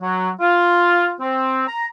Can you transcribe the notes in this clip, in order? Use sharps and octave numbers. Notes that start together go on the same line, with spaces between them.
F#3
F4
C4
A#5